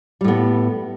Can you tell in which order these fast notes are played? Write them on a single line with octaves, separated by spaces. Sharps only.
G3 A2 B3